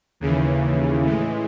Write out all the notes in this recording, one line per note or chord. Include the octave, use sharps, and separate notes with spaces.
D#2 C#3 E3
A2 E3 G#3